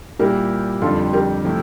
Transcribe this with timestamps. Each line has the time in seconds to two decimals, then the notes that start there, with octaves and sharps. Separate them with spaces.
0.19 A#2 G3 A#3 E4 G4 A#4
0.82 F2 D3 G3 F4 A4
1.13 G4 A#4
1.45 C3 F3 A3 E4